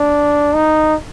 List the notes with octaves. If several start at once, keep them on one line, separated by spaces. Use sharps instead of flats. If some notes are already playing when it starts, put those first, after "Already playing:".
Already playing: D4
D#4